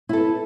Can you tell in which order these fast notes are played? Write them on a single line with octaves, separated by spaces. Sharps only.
E4 A4 B4